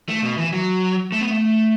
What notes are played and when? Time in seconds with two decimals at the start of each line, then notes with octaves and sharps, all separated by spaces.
0.09 A3
0.23 B2
0.38 E3
0.53 F#3
1.12 A3
1.21 B3
1.30 A3